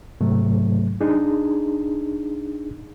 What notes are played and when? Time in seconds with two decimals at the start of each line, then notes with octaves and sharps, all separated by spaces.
0.21 G#2 C3 F#3 A3
1.01 D4 D#4 G#4